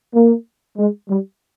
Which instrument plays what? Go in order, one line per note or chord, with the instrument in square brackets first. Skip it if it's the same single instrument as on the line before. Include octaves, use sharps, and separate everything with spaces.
[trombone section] A#3
G#3
G3